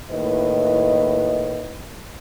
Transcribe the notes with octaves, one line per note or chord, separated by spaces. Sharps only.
D#2 A2 E4 B4 D#5